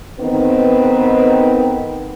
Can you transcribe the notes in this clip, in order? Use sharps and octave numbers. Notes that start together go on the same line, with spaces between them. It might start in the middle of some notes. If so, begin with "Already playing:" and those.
D#3 B3 C4 D#4 A4 B4